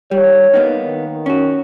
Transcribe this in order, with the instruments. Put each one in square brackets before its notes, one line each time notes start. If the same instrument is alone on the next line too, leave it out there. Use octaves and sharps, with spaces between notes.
[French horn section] D#3 G4 C#5 [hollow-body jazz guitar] G3
[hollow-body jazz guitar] A#3 B3 D#4
[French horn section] D#3
[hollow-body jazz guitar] C#4 F#4